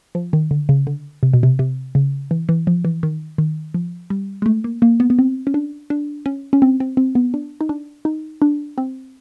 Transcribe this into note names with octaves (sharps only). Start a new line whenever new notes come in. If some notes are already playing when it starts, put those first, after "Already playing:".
F3
D#3
D3
C#3
D3
C3
B2
C3
C3
C#3
E3
E3
F3
E3
D#3
D#3
F3
G3
G#3
A3
A#3
A#3
B3
B3
C4
C#4
D4
D4
C#4
C#4
C4
C4
C4
B3
D4
D#4
D4
D#4
D4
C4